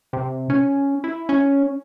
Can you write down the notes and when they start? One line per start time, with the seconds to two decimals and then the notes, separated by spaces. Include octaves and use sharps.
0.13 C3
0.50 C#4
1.04 E4
1.29 C#4